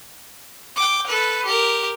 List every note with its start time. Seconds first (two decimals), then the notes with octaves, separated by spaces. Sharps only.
0.76 G5 D6
1.07 A4 B4
1.45 G4 A#4